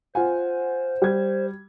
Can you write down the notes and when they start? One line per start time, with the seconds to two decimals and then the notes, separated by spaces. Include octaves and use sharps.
0.15 F4 C5 F#5 G#5
1.02 G3 G#6